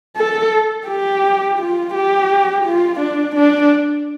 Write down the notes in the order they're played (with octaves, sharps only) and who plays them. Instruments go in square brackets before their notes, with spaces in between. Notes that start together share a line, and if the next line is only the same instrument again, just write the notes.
[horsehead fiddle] A4
G4
F4
G4
F4
D4
D4